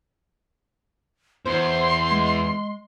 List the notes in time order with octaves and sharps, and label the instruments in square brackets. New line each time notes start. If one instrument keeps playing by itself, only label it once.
[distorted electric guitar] E2 [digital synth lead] C5 [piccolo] C6
[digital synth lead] G#3